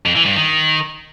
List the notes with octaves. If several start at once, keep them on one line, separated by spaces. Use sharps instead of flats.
F2
E3
G2
D#3